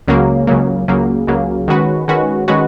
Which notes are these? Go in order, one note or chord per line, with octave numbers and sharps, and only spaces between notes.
C#2 C#3 F#3 A#3
C#2 C#3 F#3 A#3
C#2 C#3 F#3 A#3
C#2 C#3 F#3 A#3
D#3 G#3 C#4 F#4 B4
D#3 G#3 C#4 F#4 B4
D#3 G#3 C#4 F#4 B4